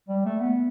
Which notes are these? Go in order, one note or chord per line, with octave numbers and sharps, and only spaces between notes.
G3
A3
B3